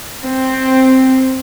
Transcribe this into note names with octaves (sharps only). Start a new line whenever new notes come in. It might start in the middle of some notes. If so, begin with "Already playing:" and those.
C4